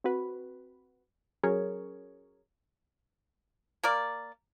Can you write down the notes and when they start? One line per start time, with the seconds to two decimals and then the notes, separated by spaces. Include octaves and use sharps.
0.04 C4 F#4 B4
1.43 F#3 C#4 G#4 A#4 C#5
3.83 A#3 A#4 D5